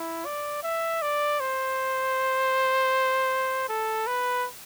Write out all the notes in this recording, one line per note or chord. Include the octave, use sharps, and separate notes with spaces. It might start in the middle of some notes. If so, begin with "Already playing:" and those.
Already playing: E4
D5
E5
D5
C5
A4
B4